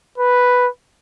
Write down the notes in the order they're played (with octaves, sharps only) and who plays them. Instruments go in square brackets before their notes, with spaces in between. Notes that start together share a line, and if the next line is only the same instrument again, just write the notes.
[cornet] B4